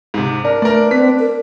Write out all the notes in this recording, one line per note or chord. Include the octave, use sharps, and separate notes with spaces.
G#2 C3
D4 A#4
A3 A#4 B4 D5
C4 B4 B6
A#4